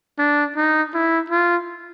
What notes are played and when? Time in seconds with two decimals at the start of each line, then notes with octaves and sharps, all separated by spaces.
0.18 D4
0.56 D#4
0.94 E4
1.30 F4